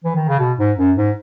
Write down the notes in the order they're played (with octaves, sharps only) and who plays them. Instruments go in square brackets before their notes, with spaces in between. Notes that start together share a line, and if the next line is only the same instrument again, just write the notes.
[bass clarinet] E3
D#3
C#3
B2
G#2
F#2
G#2